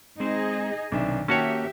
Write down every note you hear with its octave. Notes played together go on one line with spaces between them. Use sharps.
G#3 C4 D#4 G#4 C5 D#5
B1 C3 D#3 D4 E5
A#3 C#4 F#4 G4 C#5 E5 G5 A5